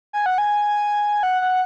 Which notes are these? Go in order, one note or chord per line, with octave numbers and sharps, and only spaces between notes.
G#5
F#5
G#5
F#5
F#5